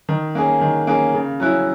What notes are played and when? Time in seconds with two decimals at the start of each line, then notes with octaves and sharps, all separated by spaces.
0.09 D#3
0.35 A#3 C#4 G#4
0.61 D#3
0.87 A#3 C#4 G#4
1.14 C#3
1.40 F#3 C#4 E4